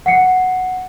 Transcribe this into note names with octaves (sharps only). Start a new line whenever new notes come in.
F#5 C7 C#7